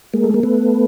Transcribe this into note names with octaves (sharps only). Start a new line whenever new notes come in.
G#3 A#3
A3
A#3
A3 B3